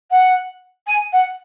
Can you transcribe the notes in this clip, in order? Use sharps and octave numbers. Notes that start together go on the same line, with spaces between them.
F#5
G#5
F#5